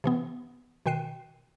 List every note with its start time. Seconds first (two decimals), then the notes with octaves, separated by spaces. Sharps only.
0.04 C3 E3 B3
0.86 B2 D#3 G5 F#6 C7 D#7